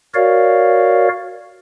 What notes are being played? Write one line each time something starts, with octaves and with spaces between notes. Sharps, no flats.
F#4 A#4 C#5 D5 F5